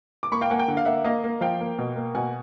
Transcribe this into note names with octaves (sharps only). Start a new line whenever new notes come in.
D6
A#3 B5 C#6
F5 G5
A#3 F#5 G#5
G5
D3 F#5
F5
A#3 E5 F#5
A#3 D#5 F5
A#3
F3 F5 G5
A#3
B2
A#3
B2 F#5 G#5